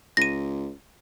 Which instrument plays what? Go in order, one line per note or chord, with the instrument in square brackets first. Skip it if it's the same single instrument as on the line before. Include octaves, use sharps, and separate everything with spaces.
[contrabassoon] C#2 [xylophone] A#6 D#7